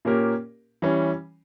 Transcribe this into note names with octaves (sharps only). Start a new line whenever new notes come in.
A#2 A#3 C#4 G4 A#4
E3 G3 C#4